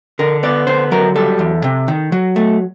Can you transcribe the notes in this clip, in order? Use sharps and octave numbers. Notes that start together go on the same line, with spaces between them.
D3 A#4
B3 D5
D3 C5
F#3 A#4
G3 A4
E2
C3
D#3
F#3
A3